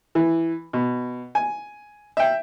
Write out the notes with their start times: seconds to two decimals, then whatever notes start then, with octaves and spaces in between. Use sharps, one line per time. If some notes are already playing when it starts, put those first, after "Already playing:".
0.15 E3
0.73 B2
1.35 G#5
2.17 E5 G5